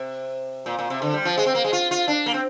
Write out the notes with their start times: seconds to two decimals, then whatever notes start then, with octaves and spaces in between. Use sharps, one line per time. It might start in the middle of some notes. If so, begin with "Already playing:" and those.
Already playing: C3
0.66 A#2
0.79 A#2
0.90 C3
1.02 D3
1.14 G3
1.25 F3
1.38 G#3
1.46 C4
1.55 A#3
1.64 G#3
1.73 F4
1.91 F4
2.08 D4
2.26 A#3
2.34 C4